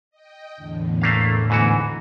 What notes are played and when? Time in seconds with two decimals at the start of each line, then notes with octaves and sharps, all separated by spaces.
0.11 D#5 G5
0.56 E2 A2 D3
1.02 A3 A#3 F5
1.50 G#2 E3 F#4